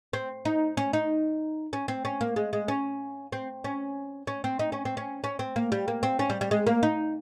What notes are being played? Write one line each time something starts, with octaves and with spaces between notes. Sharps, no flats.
C4
D#4
C#4
D#4
C#4
C4
C#4
A#3
G#3
G#3
C#4
C4
C#4
C#4
C4
D#4
C#4
C4
C#4
C#4
C4
A#3
G3
A#3
C4
C#4
G3
G3
G#3
A#3
D#4